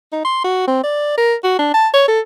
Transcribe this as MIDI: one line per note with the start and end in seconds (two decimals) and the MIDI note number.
0.12 0.24 63
0.25 0.42 84
0.44 0.67 66
0.68 0.80 60
0.84 1.17 74
1.18 1.35 70
1.44 1.54 66
1.59 1.69 62
1.74 1.88 81
1.93 2.05 73
2.08 2.20 69